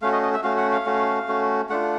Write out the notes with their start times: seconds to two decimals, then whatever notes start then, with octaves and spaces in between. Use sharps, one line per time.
0.02 A3 C#4 F#4 F5
0.12 D#5
0.22 D#5
0.33 E5
0.43 A3 C#4 F#4 F5
0.58 F#5
0.72 F5
0.86 A3 C#4 F#4
1.28 A3 C#4 F#4
1.69 A3 D4 F4 F#5